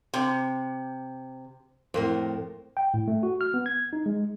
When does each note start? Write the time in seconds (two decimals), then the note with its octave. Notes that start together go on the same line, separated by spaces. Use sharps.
0.14 C3
1.94 F2 A2 A#4 C5
2.77 G5
2.94 A2
3.08 A3
3.23 F#4
3.41 F6
3.54 B3
3.66 G#6
3.93 D#4
4.06 G#3